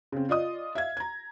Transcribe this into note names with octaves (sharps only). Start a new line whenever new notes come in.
C#3 C4
F4 D5 D#5 D#6
E5 F5 G#6
A#5 G#6